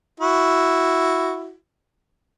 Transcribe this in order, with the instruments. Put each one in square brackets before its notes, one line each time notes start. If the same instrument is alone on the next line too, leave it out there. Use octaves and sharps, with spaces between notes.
[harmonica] E4 F#4